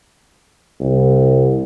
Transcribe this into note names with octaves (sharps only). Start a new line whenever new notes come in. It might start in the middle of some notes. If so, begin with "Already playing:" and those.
C2